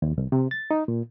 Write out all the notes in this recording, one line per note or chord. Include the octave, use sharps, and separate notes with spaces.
D#2
C2
C3
A6
D#4
A#2